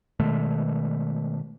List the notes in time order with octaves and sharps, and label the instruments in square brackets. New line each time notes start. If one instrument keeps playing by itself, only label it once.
[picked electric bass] B2 D#3 G#3 A3